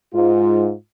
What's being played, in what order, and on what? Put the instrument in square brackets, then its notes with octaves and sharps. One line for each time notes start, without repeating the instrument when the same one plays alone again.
[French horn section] G#2 F4